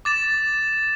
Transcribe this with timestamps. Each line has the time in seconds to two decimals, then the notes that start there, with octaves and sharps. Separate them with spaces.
0.05 D6 A6 E7